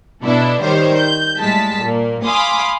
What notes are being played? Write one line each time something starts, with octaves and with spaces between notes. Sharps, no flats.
B2 D4 E4 A4
D#3 G3 C5 C#5
G6
A2 G3 G#3 A5 B6
A#2 A#3
F5 G#5 B5 C6 D6 D#6